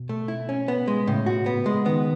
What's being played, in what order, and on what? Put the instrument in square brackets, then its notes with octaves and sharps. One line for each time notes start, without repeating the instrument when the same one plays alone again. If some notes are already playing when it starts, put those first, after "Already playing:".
Already playing: [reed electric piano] B2
[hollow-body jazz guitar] A3
E4
C#4
B3
G#3
[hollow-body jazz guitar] A2 [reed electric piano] C#3
[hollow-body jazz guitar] F#4
B3
G#3
[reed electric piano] D#3 [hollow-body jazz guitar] B3